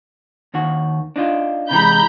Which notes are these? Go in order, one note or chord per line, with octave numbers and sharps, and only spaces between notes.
D#2 D#3 F#4
D4 D#4 F4
C3 E3 G#3 A#5 B5 G6